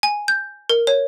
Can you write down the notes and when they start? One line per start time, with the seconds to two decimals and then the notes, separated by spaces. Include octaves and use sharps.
0.03 G#5
0.28 G6
0.69 A#4
0.87 C#5